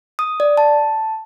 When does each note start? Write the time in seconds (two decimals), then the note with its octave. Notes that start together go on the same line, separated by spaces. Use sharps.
0.19 D#6
0.40 D5
0.57 A5